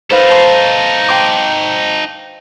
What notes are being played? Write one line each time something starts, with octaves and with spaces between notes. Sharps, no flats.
D#4 A4 B4 C5 F5
A5 C6
G5 C6 D6